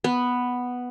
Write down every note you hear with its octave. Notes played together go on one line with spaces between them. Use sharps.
B3